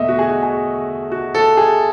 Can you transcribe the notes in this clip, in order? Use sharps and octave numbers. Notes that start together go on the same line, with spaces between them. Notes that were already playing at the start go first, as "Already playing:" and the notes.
Already playing: E2 B2 A3 D#5 E5
F#4
G#4
F#4
G#4
F#4
A4
G#4